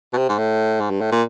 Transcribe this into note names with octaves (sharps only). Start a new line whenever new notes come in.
B2
C3
G#2
A2
G#2
G2
A2
A#2